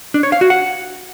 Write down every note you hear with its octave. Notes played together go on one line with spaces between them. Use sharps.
D4
C#5
F5
F#4
F#5